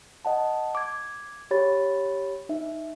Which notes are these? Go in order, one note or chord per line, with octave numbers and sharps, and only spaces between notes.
D#5 F#5 A5
D6 G#6
G4 C#5 B5 A6
D#4 E5